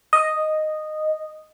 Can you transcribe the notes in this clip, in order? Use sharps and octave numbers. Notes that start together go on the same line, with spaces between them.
D#5